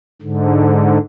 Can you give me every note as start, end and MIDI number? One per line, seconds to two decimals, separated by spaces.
0.22 0.98 44
0.22 0.98 50